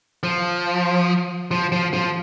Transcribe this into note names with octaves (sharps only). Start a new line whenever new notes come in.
F3
F3
F3
F3